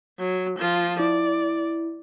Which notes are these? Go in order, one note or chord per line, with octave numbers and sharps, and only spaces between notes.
F#3
F3 F4
E4 D5